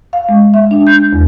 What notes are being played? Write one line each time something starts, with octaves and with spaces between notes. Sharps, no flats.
F5
G#3
E5
D4
G6
E2